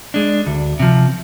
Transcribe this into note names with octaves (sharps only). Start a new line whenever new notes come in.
G#3 D4
D2
C3 F3